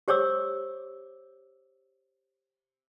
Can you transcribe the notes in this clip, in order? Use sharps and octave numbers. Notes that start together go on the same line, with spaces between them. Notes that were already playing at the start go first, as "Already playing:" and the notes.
G4 C5 C#5 D6 E6